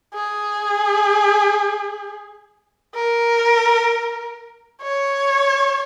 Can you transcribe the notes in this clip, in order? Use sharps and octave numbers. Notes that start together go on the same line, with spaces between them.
G#4
A#4
C#5